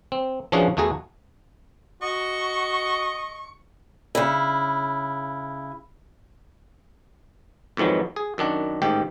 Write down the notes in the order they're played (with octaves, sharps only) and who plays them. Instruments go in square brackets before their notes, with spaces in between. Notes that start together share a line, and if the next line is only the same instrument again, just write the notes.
[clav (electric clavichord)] C4
E3 F3 C#4 D4 F#4 G#4
E2 A3 F#4 G#4 A#5
[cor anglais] F#4 [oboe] D#5 [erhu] C#6
[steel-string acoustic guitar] C#3 E4
[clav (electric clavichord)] F2 G#2 D#3 E3 F#3
G#4
F#2 D#3 D4 F#5
A1 G#2 D#3 G4 G5